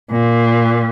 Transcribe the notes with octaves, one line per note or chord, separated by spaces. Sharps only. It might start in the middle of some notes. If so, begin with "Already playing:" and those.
A#2